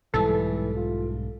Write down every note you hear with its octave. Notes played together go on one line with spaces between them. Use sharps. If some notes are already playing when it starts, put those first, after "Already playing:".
B1 G#2 E3 G3 A4
F4